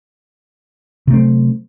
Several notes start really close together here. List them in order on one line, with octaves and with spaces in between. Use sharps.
C3 A3 C4 F#3